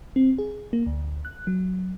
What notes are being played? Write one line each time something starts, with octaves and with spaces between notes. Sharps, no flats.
C4
G#4
A#3
D2
F#6
F#3